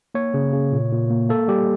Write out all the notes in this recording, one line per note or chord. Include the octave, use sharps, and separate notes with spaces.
A#3 C#5
C#3
C#3
A#2
A#2
A#3
A#3 A4
G3 G4